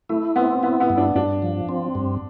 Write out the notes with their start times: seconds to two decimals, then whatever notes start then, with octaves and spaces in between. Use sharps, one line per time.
0.09 A3 E4
0.36 B3 C4
0.63 B3 E4
0.80 B3
0.90 G2
0.97 D4
1.15 G2 D4
1.42 F3
1.69 C4
1.95 G2